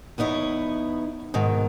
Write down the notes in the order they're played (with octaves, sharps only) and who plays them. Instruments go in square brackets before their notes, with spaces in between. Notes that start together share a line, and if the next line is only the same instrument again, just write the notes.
[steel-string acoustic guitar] E2 B3 D#4 E4 C#5
G#2 B2 D#3